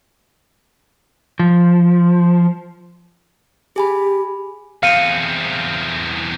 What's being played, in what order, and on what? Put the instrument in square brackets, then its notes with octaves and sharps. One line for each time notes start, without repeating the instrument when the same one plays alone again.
[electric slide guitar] F3
[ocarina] G4 [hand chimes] G#4 G#5 B5
[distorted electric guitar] E2 C4 [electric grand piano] F5 [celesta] C#7 D#7